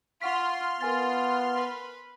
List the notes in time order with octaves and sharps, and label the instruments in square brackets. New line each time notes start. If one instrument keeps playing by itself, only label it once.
[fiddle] F4 [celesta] F#5 C#6 B6 [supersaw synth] C6 F6
[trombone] B3 [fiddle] F4 [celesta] A#4 G#5 A6
[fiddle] B4